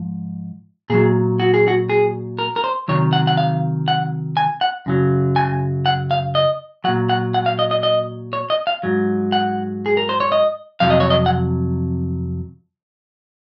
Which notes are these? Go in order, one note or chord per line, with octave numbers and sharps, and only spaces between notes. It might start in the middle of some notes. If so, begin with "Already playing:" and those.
Already playing: G#2 F3
A#2 F#3 G#4
F#4
G#4
F#4
G#4
A#4
A#4
C5
C3 D#3 F#3 C#5
F#5
F#5
F5
F#5
G#5
F#5
F#2 C#3 F#3
G#5
F#5
F5
D#5
A#2 F#3 F#5
F#5
F#5
F5
D#5
D#5
D#5
C#5
D#5
F5
G#2 F#3
F#5
G#4
A#4
C5
C#5
D#5
F2 C3 F#3 F5
D#5
C#5
D#5
F#5